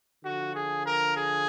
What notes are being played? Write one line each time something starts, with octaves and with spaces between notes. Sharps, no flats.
D3 F3 F#4
G#4
A#4
G#4